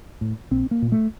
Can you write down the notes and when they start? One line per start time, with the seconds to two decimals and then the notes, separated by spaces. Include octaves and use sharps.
0.21 A2
0.51 A#1 C4
0.71 A#3
0.82 A#2
0.92 A3